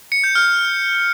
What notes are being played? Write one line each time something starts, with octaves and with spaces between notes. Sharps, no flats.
C#7
G6
F6